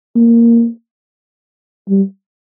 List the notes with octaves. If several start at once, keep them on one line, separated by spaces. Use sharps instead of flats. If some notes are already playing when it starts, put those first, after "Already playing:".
A#3
G3